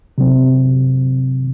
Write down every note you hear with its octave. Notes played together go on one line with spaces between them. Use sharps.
C3 F#3 C4